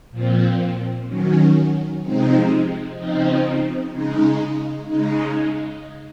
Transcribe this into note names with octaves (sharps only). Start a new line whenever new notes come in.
A#2 F3 C4
D#3 F#3 C#4
C3 F3 G#3 C4 D#4
C#3 F3 C4 D#4
C#3 G#3 D#4
C#3 G#3 D#4